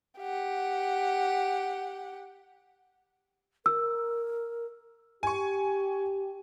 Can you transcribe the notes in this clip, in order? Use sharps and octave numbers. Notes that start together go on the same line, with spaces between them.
G4 F#5
A#4 E6
G4 G#5 C#6